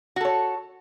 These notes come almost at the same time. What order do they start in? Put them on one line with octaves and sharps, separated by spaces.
F#4 A4 C#5